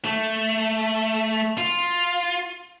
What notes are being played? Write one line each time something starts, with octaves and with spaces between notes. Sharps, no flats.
A3
F4